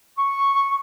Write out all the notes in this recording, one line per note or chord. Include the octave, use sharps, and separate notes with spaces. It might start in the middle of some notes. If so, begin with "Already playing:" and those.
C#6